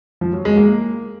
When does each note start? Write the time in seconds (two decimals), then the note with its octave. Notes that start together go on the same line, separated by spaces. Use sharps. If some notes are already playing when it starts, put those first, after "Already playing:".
0.21 F3
0.33 F#3
0.45 G#3
0.57 A#3